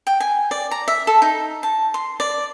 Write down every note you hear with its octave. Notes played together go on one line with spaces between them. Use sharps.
G5
G#5
D5
A#5
E5
A4
D#4
A5
C6
D5